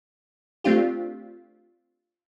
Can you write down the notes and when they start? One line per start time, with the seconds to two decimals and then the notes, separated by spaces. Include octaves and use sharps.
0.64 A3 C4 D4 F4 G4